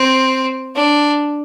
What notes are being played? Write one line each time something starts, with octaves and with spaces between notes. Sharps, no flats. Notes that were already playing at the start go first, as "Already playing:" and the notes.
Already playing: C4
D4